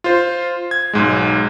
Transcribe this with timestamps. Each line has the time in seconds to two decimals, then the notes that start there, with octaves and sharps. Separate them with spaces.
0.04 F4 C5
0.71 G#6
0.93 B1 G#2 G#3